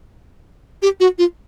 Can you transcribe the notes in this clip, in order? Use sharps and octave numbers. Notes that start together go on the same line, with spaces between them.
G4
F#4
F4